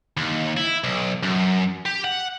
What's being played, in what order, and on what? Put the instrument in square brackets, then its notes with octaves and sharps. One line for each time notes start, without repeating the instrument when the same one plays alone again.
[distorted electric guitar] D#2
E4
B1
F#2
G4
F#5